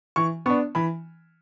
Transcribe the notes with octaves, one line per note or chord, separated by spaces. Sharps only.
E3 C#6
B3 D4 C#6
E3 B5